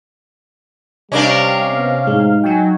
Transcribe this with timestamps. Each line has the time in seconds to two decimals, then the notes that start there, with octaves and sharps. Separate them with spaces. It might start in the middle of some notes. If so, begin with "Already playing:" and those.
1.12 C3 G3 C#4 D4 A#4 D#5 F5 C#6
1.72 B3
2.07 A2 G#3 D#4
2.44 F#3 G5 G#5